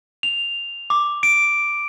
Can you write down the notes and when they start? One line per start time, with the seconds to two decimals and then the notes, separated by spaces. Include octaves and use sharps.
0.23 F7
0.90 D6
1.23 D7